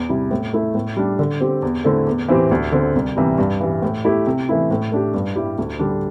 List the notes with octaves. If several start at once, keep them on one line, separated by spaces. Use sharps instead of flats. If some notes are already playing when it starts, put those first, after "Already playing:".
Already playing: E2
C3 G3 E4
A2
A3 E4
A2
G3 D4
D3
C4 G4
E2
D3 A3 C4 E4
E2
E3 C4 E4 G4
D2
D3 C4
C2
C3 E3 G3
G2
E3 G3
A2
A3 E4 G4
C3
E3 A3 E4
A2
A3 D4 G4
G2
G3 E4 G4
D2
D3 G3 D4